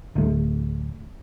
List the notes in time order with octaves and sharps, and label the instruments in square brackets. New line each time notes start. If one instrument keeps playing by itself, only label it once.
[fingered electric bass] D1 A3